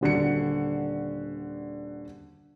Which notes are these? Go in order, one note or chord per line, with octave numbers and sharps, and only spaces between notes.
D#1 D3 F#4 C#7